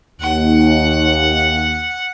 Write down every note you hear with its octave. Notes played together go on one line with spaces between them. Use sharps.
D#2 F#5